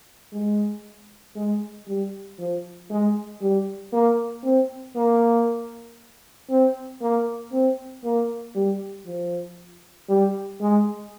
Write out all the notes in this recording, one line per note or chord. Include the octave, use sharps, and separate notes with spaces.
G#3
G#3
G3
F3
G#3
G3
A#3
C4
A#3
C4
A#3
C4
A#3
G3
F3
G3
G#3